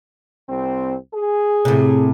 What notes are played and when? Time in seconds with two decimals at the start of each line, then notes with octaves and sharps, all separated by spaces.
0.48 C2 C4
1.13 G#4
1.65 A2 C3